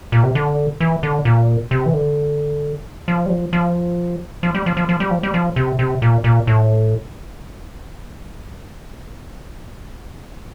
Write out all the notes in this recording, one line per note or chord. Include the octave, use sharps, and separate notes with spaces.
A#2
C3
D3
E3
D3
A#2
C3
E3
D3
F3
G3
F3
F3
F3
G3
F3
F3
F3
G3
F3
G3
F3
C3
C3
A#2
A#2
A2